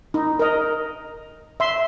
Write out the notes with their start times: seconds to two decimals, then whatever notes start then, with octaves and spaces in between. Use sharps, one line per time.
0.14 D#4
0.39 A#4 D#5
1.60 E5 C6